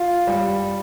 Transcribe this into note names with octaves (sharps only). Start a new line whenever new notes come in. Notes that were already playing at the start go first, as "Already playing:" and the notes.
Already playing: F4
G3